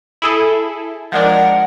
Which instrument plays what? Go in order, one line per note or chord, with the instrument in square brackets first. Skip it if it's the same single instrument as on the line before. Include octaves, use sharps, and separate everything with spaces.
[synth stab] E4 G#4 A4
[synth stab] F3 G#3 D4 [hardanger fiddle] A#4 [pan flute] F#5